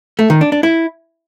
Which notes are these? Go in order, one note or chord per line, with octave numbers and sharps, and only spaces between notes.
A3
D#3
D4
D4
E4